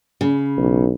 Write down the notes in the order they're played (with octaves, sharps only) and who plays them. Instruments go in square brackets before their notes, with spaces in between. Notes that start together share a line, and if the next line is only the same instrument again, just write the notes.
[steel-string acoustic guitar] C#3
[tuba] B1